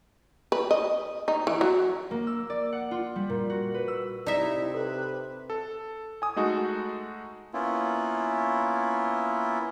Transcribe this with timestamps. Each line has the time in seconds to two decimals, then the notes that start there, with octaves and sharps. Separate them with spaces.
0.52 B4
0.71 D#5
1.28 D#4
1.47 E3
1.61 F#3
2.11 A#3
2.27 E6
2.50 D5
2.72 F#5
2.91 F4
3.16 G3
3.29 A#2
3.50 F#4
3.74 B4
3.88 E6
4.26 C3 D#4 E4 D5 E5
4.74 A4 B4
5.50 A4
6.22 G#5 D#6
6.36 G#3 A3 D#4 F#4
7.53 A#3 B3 C#4 E4 F4